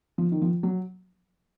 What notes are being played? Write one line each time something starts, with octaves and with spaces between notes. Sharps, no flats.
F3
D#3
F3
F#3